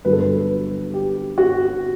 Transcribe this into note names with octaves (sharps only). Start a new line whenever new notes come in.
G1 G2 F#3 B4
A4
B4
G4
F#4